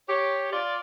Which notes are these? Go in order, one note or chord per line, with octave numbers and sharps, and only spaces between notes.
G4 C#5
F4 D5